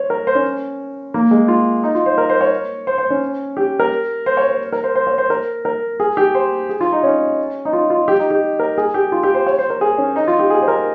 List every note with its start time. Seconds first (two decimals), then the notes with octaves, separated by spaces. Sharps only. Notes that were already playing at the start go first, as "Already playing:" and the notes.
Already playing: C5 C#5
0.10 A#4
0.27 C5
0.35 C#4
1.14 A#3
1.31 G#3
1.48 F4
1.84 D#4
1.95 F4
2.06 C5
2.18 A#4
2.30 C5
2.41 C#5
2.87 C5
2.98 C5
3.10 C#4
3.57 G4
3.80 A#4
4.26 C5
4.37 C#5
4.49 C5
4.72 A#4
4.84 C5
4.95 C5
5.07 C#5
5.18 C5
5.30 A#4
5.65 A#4
6.00 G#4
6.17 G4
6.35 C5
6.69 G#4
6.80 F4
6.92 D#4
7.03 C#4
7.65 D#4
7.73 F4
7.90 F4
8.08 G4
8.19 D#4
8.30 G4
8.60 A#4
8.78 G#4
8.94 G4
9.12 F4
9.23 G4
9.35 C5
9.47 C#5
9.58 C5
9.70 A#4
9.81 G#4
9.98 C#4
10.16 D#4
10.27 F4
10.39 G4
10.50 G#4
10.62 C5
10.68 A#4